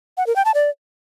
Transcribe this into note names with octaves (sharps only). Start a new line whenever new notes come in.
F#5
A#4
G5
A5
D5